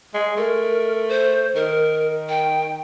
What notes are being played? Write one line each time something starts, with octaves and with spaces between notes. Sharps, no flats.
G#3
A3 A#4
C5
D#3 A#4
G5